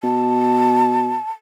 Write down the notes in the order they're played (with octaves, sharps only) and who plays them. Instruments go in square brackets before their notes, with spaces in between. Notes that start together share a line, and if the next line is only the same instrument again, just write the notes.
[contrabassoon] B2 [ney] A5